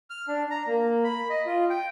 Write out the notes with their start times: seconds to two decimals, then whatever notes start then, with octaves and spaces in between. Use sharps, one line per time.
0.10 F6
0.28 D4
0.51 A#5
0.67 A#3
1.04 B5
1.30 D#5
1.46 F4
1.70 G5